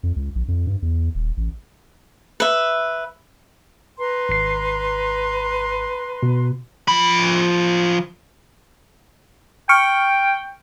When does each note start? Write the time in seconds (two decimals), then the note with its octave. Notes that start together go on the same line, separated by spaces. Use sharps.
0.03 F2
0.16 C#2
0.36 A#1
0.48 F2
0.67 G2
0.82 E2
1.15 D#1
1.37 A1
2.40 B4 E5
3.98 B4 A#5 C6
4.29 G#1 C7
6.23 B2
6.88 F3 B5
9.69 G5 C#6 F6 C#7